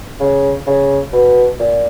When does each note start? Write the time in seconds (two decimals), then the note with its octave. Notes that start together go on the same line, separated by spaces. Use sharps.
0.20 C#3
0.67 C#3
1.13 B2
1.59 A#2